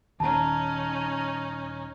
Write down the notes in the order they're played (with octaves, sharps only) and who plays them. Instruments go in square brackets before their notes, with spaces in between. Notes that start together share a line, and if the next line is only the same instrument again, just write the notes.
[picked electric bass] D#1 [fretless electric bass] D#2 [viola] C#4 D#4 [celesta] A5 A#5